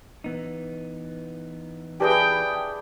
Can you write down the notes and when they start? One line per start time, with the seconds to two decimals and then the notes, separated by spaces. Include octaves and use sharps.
0.24 E3 B3 D#4
2.00 D4 E4 G4 G#4 B4 G5